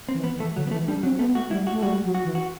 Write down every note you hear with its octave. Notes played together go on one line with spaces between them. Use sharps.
C4
E3
B3
E3
A3
D3 F#3
B3
E3 A3
G3 D4
F#3 C4
A3 B3
A3 F#4
G3 E4
F#4
A3
G3 F#4
F#3
F#4
E3
F#4